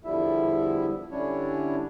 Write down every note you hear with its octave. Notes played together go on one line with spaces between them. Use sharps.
E2 D3 F3 G3 E4 E5
D3 G3 C#4 D4 E4 C#5